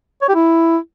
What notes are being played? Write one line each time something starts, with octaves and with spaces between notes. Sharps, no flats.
C#5
G4
E4